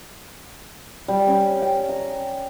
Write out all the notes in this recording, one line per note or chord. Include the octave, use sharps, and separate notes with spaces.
G3
C#4
G5
A#5